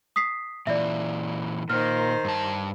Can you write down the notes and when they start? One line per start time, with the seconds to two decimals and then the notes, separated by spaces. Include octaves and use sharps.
0.16 D#6 B6 C7
0.67 A#2 E3 D5 E5
1.70 A#2 D#3 C5 F6
2.25 G2 A5